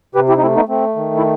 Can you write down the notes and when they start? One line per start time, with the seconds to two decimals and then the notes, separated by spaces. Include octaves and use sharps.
0.15 C3 G4 B4
0.28 E4 G4
0.37 D#4
0.41 A3 C4 E4
0.56 B3 D#4
0.69 A3 C4
0.96 D#3
1.17 E4